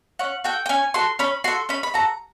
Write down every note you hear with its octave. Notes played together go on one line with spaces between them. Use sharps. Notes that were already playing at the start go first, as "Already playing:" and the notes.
C#4 F#5
F#4 A4 G5
G5
C#4 G#5
F#4 A4 C6
C#4 B5
F#4 A4 C6
C#4 B5
B5
F#4 A4 A#5